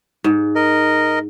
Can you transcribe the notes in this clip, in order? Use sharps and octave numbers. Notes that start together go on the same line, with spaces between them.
G#2
A#4 D#5